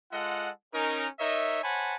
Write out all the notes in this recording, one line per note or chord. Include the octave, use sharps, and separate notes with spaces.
G#3 F4 A4 D#5 F#5
C#4 D#4 A#4
D#4 A#4 C#5 D#5 E5
C5 C#5 F#5 G#5 A5 B5